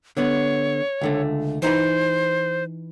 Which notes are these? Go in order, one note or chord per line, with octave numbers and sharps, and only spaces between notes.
D3 B3 C#5
C#2 D3 A3
E3 D#4 B4 C5